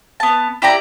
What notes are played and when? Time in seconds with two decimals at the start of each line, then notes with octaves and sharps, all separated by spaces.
0.20 B3 A5
0.62 E4 G4 D5 A#5